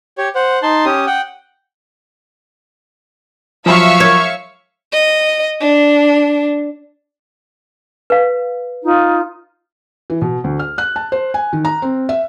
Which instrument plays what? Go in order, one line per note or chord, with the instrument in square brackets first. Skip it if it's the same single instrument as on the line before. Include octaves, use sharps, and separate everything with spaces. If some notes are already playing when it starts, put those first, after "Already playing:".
[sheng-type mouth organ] G4 C#5
C5 F#5
D#4 A5 C6
C#4 G4 D#6
F#5 G5
[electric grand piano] F3 F#3 [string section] E5 F5 C#6
[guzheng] C#5
[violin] D#5
D4
[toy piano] B4 F5
[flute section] D#4 F4
[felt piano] E3
B2
D2
F6
F#6
A5
C5
G#5
D#3
A#5
C4
E5